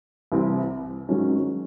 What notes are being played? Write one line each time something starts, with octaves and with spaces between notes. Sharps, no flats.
C2 C3 E3 C4 E4
G#2 D#3 F#3 C#4